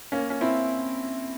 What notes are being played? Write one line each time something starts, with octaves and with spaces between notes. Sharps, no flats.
A#3 C#4
C#4
C4 E4